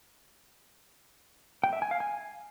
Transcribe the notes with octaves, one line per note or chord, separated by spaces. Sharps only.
G5
E5
G#5
F5
G#5